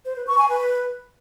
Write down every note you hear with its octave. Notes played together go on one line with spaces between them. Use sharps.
C5
B4
C#6
G#5
B4